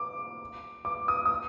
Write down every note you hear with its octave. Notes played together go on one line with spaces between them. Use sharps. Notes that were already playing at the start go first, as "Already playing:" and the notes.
Already playing: D6
D6
D#6
D#6